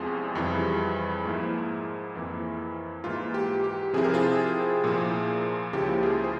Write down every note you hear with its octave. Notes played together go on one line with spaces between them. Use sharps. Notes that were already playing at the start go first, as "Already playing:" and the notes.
Already playing: E2 C3 F3 G#3 F4 G#4
F2 E3 G3
G#2 F3 A#3 E4
F2 E3 A#3 E4
G#2 E3 A#3 F4
G4
G4
C3 F3 C4 E4 G#4
A#4
F4 G#4
A#2 F3 A#3 E4
C#2 C#3 F3 A#3 E4 G4
F4 G#4
C5